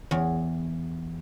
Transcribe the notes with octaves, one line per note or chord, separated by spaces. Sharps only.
E2